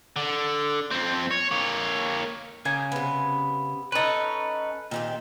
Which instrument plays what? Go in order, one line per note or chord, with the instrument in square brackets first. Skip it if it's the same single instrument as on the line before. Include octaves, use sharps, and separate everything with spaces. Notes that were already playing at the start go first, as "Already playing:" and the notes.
[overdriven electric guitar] D3
F2 C4
C#5
A#3 C#5
[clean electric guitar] C#3 G#5 [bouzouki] A#3
[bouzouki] C3 B3
[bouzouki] C#4 D#4 [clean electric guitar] A4 B4
[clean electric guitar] A#2 [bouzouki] D#3 C4 G4